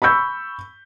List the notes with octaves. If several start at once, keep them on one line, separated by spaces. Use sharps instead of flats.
B5 C#6 E6 G6